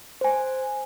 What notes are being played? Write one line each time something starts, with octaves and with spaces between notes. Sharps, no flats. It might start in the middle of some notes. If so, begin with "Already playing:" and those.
C5 G#5